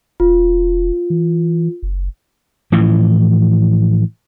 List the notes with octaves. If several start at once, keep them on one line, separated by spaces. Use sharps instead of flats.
E1 F4
E3
F#1
A2 E3 F3